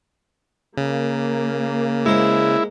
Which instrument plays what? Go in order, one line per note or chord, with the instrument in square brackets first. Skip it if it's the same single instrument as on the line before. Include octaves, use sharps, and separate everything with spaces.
[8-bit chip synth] C#3 [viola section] A#3
[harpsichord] G#3 C5 [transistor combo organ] E4